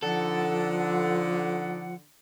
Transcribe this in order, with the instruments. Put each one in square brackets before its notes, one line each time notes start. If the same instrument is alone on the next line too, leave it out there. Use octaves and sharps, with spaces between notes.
[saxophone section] D3 [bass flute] F3 [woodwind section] D#4 D5 F#5 [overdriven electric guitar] A4